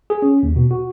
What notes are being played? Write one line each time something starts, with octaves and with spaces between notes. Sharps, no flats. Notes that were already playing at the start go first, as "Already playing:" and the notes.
G#4
C#4
D#2
B2
F#4